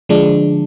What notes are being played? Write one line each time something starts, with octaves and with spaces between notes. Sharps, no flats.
D3 F3 G#3 D4